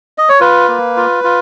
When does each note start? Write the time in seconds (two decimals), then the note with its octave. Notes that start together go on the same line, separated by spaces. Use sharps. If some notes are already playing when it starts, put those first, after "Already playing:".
0.18 D#5
0.29 C#5
0.41 F4 B4
0.68 A#3
0.97 F4
1.24 F4